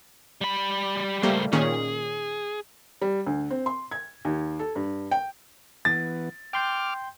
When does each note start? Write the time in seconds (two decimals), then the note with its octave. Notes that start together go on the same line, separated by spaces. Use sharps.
0.41 G3 B5
1.23 C#2 G3 A3 A#3 C5
1.53 A#2 D#3 C#4 G#4
3.02 G3
3.26 D2
3.50 C4
3.66 C6
3.91 G#6
4.25 D#2
4.59 A4
4.76 G2
5.11 G5
5.85 E3 B3 A6
6.53 G5 C6 D6 F6 G6